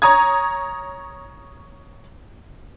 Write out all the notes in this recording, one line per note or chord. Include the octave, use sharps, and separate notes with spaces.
C#5 A#5 D#6 G#6